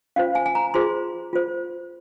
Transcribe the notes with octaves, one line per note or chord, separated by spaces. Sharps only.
C#4 F4 C5 F5
G#5
G#5
A#5
F4 G#4 C5 C6
F4 C5